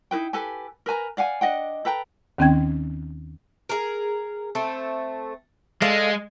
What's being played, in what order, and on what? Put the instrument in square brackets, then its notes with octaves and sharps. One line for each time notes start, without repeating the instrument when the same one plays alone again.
[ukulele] D#4 E4 B4 G5
G4 A4 B4 G#5
A#4 B4 G#5 A#5
D5 F5 F#5 G#5
D4 D#5 F#5 G5
A4 B4 G5 A#5
[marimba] D#2 D#3 C4 C#4 G5 G#6
[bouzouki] G#4 A#4
A3 C4 A4
[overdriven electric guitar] G#3 [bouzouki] A4 D5 F5